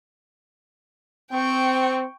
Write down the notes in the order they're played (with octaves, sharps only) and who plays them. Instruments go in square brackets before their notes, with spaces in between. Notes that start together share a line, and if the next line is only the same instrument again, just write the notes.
[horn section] C4 [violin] G5 C#6